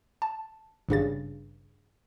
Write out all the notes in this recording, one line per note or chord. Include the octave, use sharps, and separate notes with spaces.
A5
G#1 G2 C#3 A6